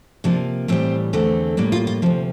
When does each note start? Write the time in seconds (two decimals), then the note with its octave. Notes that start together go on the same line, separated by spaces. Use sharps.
0.24 C3 F3 A#3 D4
0.68 A2 E3 G3 C4
1.13 E2 D3 A3 C4
1.57 A2 G3 A#3 D4
1.72 F4
1.87 F4
2.02 D2 C3 F3